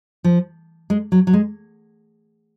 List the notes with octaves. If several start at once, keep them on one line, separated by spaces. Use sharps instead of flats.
F3
G#3
F#3
F#3
G#3